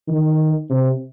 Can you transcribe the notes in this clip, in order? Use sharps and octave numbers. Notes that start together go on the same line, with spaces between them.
D#3
C3